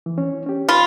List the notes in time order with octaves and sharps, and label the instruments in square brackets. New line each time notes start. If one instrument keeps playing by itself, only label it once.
[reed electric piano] E3
C#4
C#4 G4
[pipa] F4 [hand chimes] B5